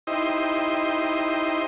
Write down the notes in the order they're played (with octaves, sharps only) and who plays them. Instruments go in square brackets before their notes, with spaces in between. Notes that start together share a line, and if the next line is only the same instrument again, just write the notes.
[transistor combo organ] D#4 E4 G4 C5 D#5